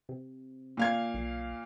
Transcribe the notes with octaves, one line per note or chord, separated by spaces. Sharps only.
C3
A#2 F5 G#6
B1